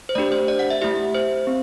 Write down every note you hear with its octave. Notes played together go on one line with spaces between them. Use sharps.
C5
A3 D4 G4 D5
C5
D5
F#5
E5
A3 E4 G4 E5
C5
C4